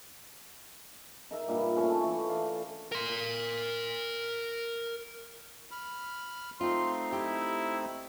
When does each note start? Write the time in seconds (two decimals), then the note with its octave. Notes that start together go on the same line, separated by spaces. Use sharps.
1.31 D#4 A#4 E5
1.48 G2 A#2 B4
1.77 A3 C#4 A4 G#5
2.02 E3 C#5
2.29 D5 F5
2.92 A#4 C6
5.71 B5 F6
6.61 A3 C4 D#4 F4 C6
7.13 E4 G4